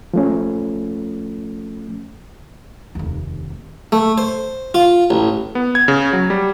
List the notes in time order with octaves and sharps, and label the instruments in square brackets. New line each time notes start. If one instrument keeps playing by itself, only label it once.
[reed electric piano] F3 A3 C#4
[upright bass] F1 D#2
[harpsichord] A3
C5
F4
A1
[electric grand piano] B3
G#6
C#3
F#3
G3